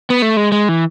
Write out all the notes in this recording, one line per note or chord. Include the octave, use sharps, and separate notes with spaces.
B3
A3
G#3
G#3
E3